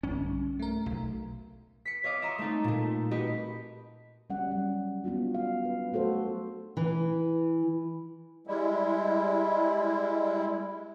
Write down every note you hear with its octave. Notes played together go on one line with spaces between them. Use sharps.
B1 G2 D3 C#4
A3 A#4
B1
B6 C#7
C#5 D#5 F5 D6 D#6
E5 A#5 C6 D#6
A3 C4 D#4 A4
A#2 A3
F#4 G4 B4 D#5 B5
G3 C#4 F#5
F#3 C#4
B3 D4 F4 F#4
F5
D4 B4
F#3 A3 F#4 A4 C5
E3
G3 G#3 E4